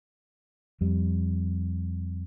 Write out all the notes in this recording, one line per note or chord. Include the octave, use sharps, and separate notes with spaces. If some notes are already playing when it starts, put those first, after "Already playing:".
F2 G3